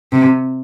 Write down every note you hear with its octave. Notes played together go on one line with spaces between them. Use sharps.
C3